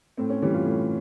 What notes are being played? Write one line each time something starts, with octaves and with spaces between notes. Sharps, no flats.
A2 C4
C#4
E3 G3 C#4
F4
A2